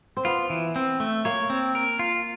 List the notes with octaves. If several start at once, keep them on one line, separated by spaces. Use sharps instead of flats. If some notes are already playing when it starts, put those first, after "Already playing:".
C4
B3 F4
E3
C4
A3
A#3 C#5
C4
A#4
F4